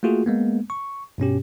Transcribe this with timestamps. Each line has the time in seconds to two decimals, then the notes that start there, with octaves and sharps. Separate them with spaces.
0.03 A3 A#3 F4 F#4 G#4
0.26 G#3 A#3 B3
0.70 C#6
1.18 G2 B2 C#4 G4